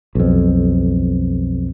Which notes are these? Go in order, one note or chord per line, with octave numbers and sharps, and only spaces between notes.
B1 F2